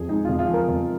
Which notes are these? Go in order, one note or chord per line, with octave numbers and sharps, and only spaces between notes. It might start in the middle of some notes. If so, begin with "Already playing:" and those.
Already playing: F2 F3 G#4
G#3 D#4
F2 F4
F4
F3 A#4
F2